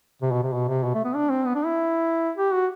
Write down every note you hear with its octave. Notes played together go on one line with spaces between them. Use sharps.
C3
B2
C3
B2
C3
B2
A3
B3
D4
C4
B3
D4
E4
G4
F#4